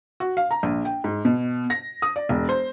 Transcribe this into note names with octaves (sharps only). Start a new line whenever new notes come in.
F#4
F5
A#5
A#1
G5
G#2
B2
A#6
D#6
D5
E1
C5